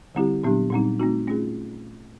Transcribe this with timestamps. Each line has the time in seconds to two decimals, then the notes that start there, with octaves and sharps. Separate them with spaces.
0.15 D3 G3 C4 E4 G4
0.44 A#2 F#3 B3 D4 G4
0.71 A#2 G3 C4 D#4
1.00 A3 C4 D#4 F#4
1.27 A3 C#4 F4 G#4